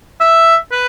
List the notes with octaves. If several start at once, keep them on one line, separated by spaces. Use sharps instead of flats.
E5
B4